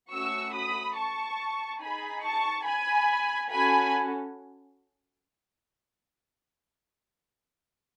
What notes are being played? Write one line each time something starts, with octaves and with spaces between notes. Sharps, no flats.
A3 C#4 F#4 C#6 E6
B5 D#6
A5 C#6
D#4 G#4 G#5 B5
A5 C#6
G#5 B5
C#4 F#4 A4 G#5 B5